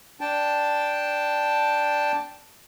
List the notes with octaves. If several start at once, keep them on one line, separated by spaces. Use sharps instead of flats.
D4 G5 A5